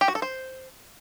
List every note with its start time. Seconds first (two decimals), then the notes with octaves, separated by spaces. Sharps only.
0.01 G4
0.08 F#4
0.15 A4
0.22 C5